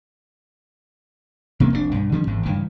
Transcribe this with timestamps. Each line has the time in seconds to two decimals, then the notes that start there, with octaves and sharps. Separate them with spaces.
1.60 C3 A#3 B3
1.72 F1 C2 G#2 D4
1.92 B1 G2
2.12 D3 F3 G3 C#4
2.27 G#1 E2 G#2
2.45 C#2 G2 D#3 E3